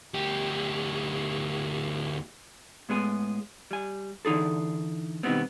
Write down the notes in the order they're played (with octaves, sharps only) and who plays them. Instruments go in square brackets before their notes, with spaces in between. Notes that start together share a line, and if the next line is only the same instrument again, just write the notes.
[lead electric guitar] D2 G4
[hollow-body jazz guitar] A2 G#3 B3 G#4
G3 G#5
D3 E3 D#4 G#4 A4
B2 D#3 F#3 G3 B3 C4